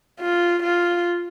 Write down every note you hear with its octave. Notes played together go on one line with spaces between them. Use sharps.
F4
F4